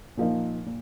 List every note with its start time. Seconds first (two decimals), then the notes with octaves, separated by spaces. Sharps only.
0.17 A#2 F3 A#3 D#4
0.66 A#2